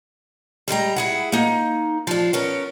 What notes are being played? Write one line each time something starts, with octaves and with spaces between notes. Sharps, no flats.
G3 G#3 G5 A#5
E4 G#4 F#5
A#3 D#4
F3 D4
B3 C#4 A#4